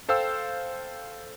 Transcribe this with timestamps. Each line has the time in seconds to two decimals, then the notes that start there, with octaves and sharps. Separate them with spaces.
0.09 A4 C5 F5 G5 E6